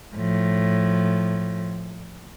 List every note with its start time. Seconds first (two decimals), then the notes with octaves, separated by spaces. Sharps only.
0.16 A2 F3